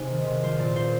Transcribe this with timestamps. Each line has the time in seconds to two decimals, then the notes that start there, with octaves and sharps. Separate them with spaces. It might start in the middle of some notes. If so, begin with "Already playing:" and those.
Already playing: C3 D#4 G#4
0.10 D#3
0.27 C3
0.43 F3 C5
0.59 A#2 D5
0.76 A#2 C5